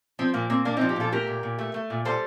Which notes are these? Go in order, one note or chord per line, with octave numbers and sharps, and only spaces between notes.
F3 C4
A#2 A#3
A#3 C4
A#2 A#3 D4
C4 D#4
F3
D#4 G4
A#2 F4 A4
A3 G4 A#4
A#2
A#2
A3
A3
A#2
G3 A4 C5